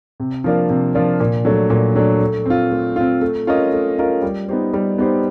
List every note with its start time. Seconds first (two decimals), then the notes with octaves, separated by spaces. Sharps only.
0.20 C3
0.44 F3 A#3 D4 F4
0.69 C3
0.94 F3 A#3 D4 F4
1.20 A#2
1.45 F#3 A3 D4
1.70 A#2
1.96 F#3 A3 D4
2.21 A3
2.46 C4 F4
2.71 A3
2.96 C4 F4
3.21 A3
3.47 C#4 F4 A#4 D#5
3.73 A3
3.98 C#4 F4 A#4 D#5
4.22 G3
4.48 B3 D#4 G4 C5
4.73 G3
4.98 B3 D#4 G4 C5